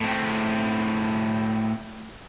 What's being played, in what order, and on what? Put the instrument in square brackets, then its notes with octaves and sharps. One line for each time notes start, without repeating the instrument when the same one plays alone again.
[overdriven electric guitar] A2 C4